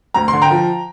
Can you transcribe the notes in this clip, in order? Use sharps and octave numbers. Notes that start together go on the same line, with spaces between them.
D2 A#5
C6
D3
G5 A#5
F3